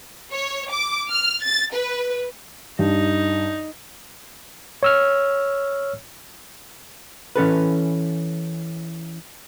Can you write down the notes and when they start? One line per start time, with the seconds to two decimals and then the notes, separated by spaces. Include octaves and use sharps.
0.32 C#5
0.71 D6
1.10 F6
1.43 A6
1.74 B4
2.79 G2 D#4
4.83 C#5 E6 F6
7.36 E3 C#4 A4 B4